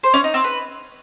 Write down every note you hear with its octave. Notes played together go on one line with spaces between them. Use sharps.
C5
C#4
D#4
C4
B4